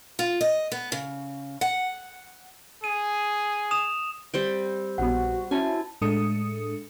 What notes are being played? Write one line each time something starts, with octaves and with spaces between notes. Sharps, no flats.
F4
D#5
B3
C#3
F#5
G#4 D#7
D#6 E7 F7
G3 C4 G5
A#1 B3 F#4 F#5
C#4 E4 F#4 G#5 A5
A2 G#3 D4 A4 D#6 C#7